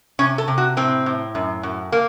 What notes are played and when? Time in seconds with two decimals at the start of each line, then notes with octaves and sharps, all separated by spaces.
0.19 C3 C#4
0.38 A4
0.48 C3
0.58 F#4
0.77 A2 C4
1.06 A2
1.35 F#2
1.63 F#2
1.92 A#3